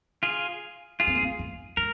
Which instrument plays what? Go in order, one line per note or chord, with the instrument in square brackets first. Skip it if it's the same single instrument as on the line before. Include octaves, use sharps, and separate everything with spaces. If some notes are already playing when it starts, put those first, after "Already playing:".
[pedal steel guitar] F4 G#4
F4 G#4
[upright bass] C4
A#3
C4
A#3
[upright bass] G#3 [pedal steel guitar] A#4